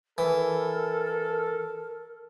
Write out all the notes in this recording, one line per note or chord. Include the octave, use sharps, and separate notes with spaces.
E3 A4 A#4